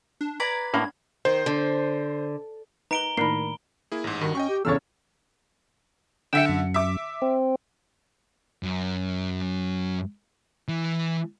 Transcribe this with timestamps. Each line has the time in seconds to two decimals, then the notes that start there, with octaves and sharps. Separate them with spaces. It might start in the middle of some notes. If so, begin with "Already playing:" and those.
0.21 D4
0.40 B4 D5 A#5 G#6
0.74 A2 A#3 D4 F#5 B5
1.25 D#3 C5
1.46 D3
2.91 D#4 B4 A#5 D7 G7
3.17 A2 D#3 A#3 D4 A#4 B5 C7
3.92 A#3 E4 G#4
4.04 A1 G#2
4.21 G2 D#3 F#4
4.35 C#4 D#5 G5 C#6
4.49 G4
4.65 E2 C#3 A4 C#5 E6 F6 A6
6.33 D3 E5 G5 E6 C#7
6.49 F#2
6.74 E5 D6
7.22 C4
8.63 F#2
10.68 E3